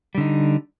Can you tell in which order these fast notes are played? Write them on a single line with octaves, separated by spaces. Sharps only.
G3 D3 D#4